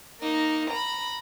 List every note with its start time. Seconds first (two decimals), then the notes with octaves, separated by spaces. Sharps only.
0.21 A#3 D#4
0.70 A#5 B5